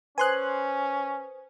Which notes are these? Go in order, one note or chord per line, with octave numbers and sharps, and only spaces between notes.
C#4 B4 C5 G#5 C6 D#6 F#6